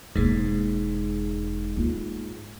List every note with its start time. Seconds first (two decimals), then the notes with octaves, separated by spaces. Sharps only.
0.16 E1 G#2 A#3
1.76 A#3 F4